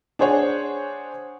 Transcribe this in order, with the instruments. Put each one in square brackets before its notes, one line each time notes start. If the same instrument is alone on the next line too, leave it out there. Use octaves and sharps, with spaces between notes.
[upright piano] D4 G#4 C5 C#5 F#5